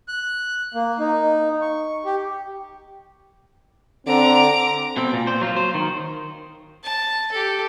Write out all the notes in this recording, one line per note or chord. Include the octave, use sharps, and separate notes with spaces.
F#6
A#3
D#4
C#6
G4
D3 C4 A#5 D6
B2 C4
A#2
C5
F#3 F4
C5
D#3
A5
G4 A4